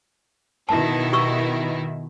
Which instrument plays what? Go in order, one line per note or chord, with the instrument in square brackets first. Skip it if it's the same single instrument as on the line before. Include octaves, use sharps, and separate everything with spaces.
[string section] B2 D#3 E4 [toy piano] A5
[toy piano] G4 C#6 E6